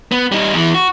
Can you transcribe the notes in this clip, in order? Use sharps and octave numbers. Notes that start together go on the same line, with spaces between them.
B3
G3 D#4
E2 E3
F#4